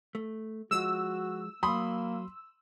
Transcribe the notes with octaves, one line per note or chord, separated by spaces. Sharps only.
A3
F3 G#3 F#4 E6
F#3 A#3 B5 C6 D#6